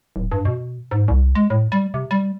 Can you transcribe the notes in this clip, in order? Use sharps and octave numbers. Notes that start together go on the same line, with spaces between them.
D1
G2
B2
G#2
C2
G#3
A2
G3
C3
G3